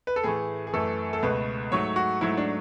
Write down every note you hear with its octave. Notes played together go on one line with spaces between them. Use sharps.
B4
A4
A2 E3 A3 G#4
G#4
F#2 E3 A3 A4
A4
C#2 B2 A3 B4
G#2 F#3 A3 C#5
F#4
G#2 F#3 A3 E4
D4